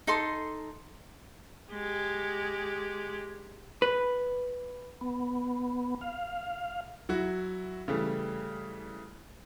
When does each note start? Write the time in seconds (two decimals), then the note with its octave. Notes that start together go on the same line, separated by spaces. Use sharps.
0.07 D#4 A4 C6
1.72 G#3 G4
3.82 B4
5.01 B3
6.01 F5
7.09 F#3 E4 F#4
7.88 C#3 E3 G3 A3